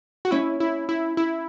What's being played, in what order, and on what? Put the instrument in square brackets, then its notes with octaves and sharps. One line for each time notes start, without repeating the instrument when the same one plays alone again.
[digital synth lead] F#4
[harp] C#4 [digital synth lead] E4
[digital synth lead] E4
E4
E4